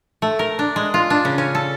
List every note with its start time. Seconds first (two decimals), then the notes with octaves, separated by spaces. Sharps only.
0.22 A3
0.39 A#4
0.59 D4
0.76 G#3
0.94 F4
1.10 D4
1.25 C#3
1.38 C#4
1.55 A4